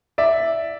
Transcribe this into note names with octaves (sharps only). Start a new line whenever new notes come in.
D5 E5